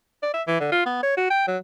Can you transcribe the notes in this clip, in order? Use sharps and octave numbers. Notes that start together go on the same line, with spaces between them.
D5
E5
E3
D3
F4
B3
C#5
F#4
G5
F#3